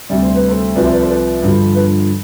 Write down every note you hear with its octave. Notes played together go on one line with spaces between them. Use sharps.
D2 C3 G3 D5
C5
B4
A4 C5
C2 C3 F3 B4 D5
C5 E5
B4 D5
A4 C5
B4 D5
G2 D3 F3
B4